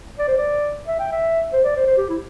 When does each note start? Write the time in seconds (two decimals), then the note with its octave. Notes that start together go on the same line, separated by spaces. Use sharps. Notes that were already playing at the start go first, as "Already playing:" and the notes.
0.19 D5
0.27 C5
0.37 D5
0.87 E5
0.99 G5
1.12 E5
1.53 C5
1.64 D5
1.76 C5
1.87 C5
1.97 G4
2.09 E4